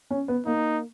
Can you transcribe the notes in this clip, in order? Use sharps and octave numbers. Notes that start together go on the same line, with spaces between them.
C#4
B3
A#3 D#4